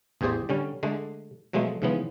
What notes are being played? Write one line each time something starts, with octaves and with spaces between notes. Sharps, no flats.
A1 E2 G4 G#4 C5 D5
D3 G3 C#4
D3 G#3 A3 D4
B2 F3 F#3 G#3 A3
G#2 C#3 E3 F3 B3